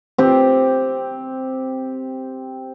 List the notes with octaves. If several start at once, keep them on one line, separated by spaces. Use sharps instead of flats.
C4 G4